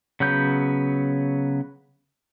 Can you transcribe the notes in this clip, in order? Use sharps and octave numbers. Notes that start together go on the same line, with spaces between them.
C#3 F#3 B3 G6